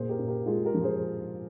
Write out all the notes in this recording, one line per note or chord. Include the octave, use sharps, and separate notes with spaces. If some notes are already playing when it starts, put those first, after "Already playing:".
Already playing: A#2 G#4 C5
G4 A#4
A#2
G4 A#4
G#3 F4 G#4
G4 A#4
F3
G#4 C5